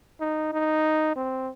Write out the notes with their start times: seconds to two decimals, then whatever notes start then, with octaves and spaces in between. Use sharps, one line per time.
0.20 D#4
0.53 D#4
1.16 C4